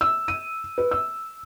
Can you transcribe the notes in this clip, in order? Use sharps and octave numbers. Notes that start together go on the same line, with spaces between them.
E6
D#7
B4
E6